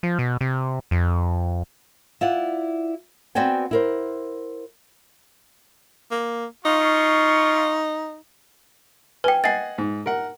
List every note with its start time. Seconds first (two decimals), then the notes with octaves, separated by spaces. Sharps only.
0.03 F3
0.19 B2
0.41 C3
0.91 F2
2.21 E4 F4 D5 F#5
3.35 B3 C4 F#4 D5 G5 G#5
3.71 E4 A#4 C5
6.11 A#3
6.65 D#4 F4 C#6
9.24 B4 G5 G#5
9.44 D#5 F#5 G#5 A6 C7
9.78 G#2
10.06 A#4 F#5